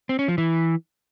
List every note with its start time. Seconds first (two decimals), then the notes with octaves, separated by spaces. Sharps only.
0.09 C4
0.19 C#4
0.28 F3
0.38 E3